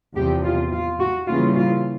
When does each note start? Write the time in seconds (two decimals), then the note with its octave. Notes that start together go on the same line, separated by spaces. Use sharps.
0.16 E2 C3 F3 G4
0.44 F4
0.72 F4
1.00 F#4
1.28 C#3 E3 G3 A#3 F4
1.56 F4